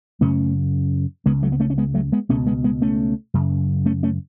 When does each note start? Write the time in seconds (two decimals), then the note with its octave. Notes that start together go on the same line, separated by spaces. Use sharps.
0.21 F#2 C#3 A3 C#4
1.26 C#2 C#3 G#3 B3
1.43 F#3 A3
1.52 B3
1.60 A3 C#4
1.70 C#4
1.78 G#3 B3
1.94 F#3 A3
2.12 G#3 B3
2.29 C#2 B2 A3 C#4
2.47 G#3 B3
2.64 G#3 B3
2.82 A3 C#4
3.34 F#2 C#3
3.86 A3 C#4
4.03 A3 C#4